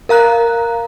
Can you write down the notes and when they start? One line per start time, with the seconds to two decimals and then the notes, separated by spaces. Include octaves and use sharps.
0.09 A#4 F5 A#5 F#6